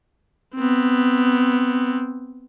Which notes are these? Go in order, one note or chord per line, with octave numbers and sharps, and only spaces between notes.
B3 C4